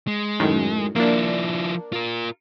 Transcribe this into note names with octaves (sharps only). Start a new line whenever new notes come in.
G#3
F#2 A2 D#3
F3 A#3 D4 E4
F4 A#4